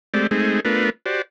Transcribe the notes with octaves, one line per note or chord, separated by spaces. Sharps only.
G#3 A3 C4 G4 D5
G#3 A3 C4 D#4 G#4
A3 B3 D4 F4 A#4 B4
F#4 G4 C5 D5